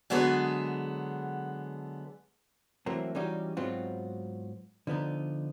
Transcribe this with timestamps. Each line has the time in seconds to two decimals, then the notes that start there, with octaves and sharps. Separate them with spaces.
0.10 D3 F#3 G#3 B3 G#4 A4
2.86 E3 F#3 A3 A#3 C4
3.15 E3 G3 C#4 D#4 F#4 G4
3.57 G#2 F#3 B3 C4 F4 F#4
4.87 D3 F3 B3 D#4